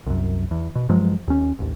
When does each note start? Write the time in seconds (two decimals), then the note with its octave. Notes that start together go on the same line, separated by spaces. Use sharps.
0.06 C2 F#2
0.51 E2
0.75 B2
0.89 G2 F3 F#3 G#3
1.28 D#2 C#4
1.59 A1 D#2